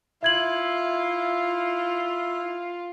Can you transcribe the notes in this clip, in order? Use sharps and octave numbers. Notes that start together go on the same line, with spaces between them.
E4 F4 E5 G#6 F#7